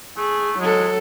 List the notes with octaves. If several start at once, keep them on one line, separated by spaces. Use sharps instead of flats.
A3 G#4
F#3 G#3 A4